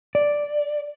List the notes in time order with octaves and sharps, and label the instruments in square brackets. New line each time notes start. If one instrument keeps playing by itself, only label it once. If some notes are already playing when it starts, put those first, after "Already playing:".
[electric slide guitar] D5